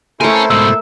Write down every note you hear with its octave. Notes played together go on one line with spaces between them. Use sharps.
A3 E4 A4 A#4 C5 C#5 G#5
G#2 B2 E5